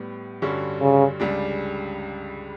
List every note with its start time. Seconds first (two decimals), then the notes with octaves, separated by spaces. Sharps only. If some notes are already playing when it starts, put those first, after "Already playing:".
Already playing: A2 G3 B3
0.42 G2 D3 G3 C#4 F#4
0.81 C#3
1.20 C#2 C#3 G3 D4